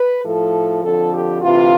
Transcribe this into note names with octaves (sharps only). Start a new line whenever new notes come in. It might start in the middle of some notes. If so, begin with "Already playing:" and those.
Already playing: B4
A2 F3 A4
F2 D3 F3 A4
G4
D2 C3 E3 F4